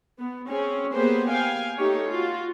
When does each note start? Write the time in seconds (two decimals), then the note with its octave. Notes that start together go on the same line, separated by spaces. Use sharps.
0.19 B3
0.49 C4 C#4 G#4
0.92 A#3 B3 G4 G#4 B4 C5
1.31 F5 G5 G#5
1.78 A3 D#4 G4 C#5
2.08 F4 F#4